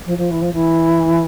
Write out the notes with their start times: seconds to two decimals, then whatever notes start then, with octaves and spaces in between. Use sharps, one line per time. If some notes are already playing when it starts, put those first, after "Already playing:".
0.06 F3
0.17 F3
0.30 E3
0.41 F3
0.53 E3